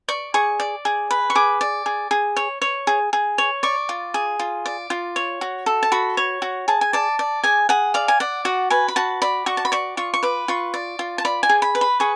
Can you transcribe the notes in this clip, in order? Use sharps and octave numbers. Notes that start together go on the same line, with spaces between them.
D5 C#6
G#4 C#6
D5
G#4
B4
C#6
G#4 D6
D5
G#4
G#4
C#5
C#5
G#4
G#4
C#5
D5 C#6
F4
G#4
F4
D5
F4
C#5
F#4
A4
A5
F#4 B5
C#5
F#4
G#4 A5
G#5
D5 A5
D5
G#4 G#5
G#4 F#5
D5 F5
G#5
D5 F#5
F#4 F#5
B4 G#5
B5
F#4 A5
D5 B5
F#4 C#6
A5
B5
D5 C#6
F4 C#6
C#6
B4 D6
F4 C#6
D5
F4
A5
D5 B5
G#5
G#4
B5
B4
B5
G#4 C#6